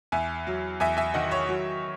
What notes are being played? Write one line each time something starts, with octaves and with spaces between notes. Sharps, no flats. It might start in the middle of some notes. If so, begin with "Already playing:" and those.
E2 E5 G#5
F#3
E2 E5 G#5
E5 G#5
D#3 D#5 F#5
C#5 E5
F#3